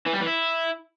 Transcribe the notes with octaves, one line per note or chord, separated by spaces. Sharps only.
E3
G3
E3
E4